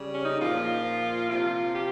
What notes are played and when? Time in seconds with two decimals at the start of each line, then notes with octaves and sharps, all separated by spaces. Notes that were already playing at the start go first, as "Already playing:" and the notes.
Already playing: C#3 G3
0.15 C#4
0.25 D#4
0.40 A#2 F3 F4
1.30 C3 F3 F4
1.75 G4